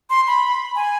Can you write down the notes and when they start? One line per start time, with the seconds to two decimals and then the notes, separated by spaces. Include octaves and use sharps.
0.10 C6
0.27 B5
0.75 G#5